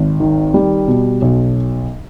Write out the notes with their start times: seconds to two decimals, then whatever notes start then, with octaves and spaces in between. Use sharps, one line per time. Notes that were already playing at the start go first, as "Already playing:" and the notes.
Already playing: G#1
0.20 D#3
0.54 G3
0.87 B2
1.22 B1